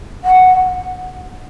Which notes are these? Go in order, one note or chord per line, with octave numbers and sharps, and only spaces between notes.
F#5